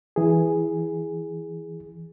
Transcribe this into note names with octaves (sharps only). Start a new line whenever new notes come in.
E3 G#4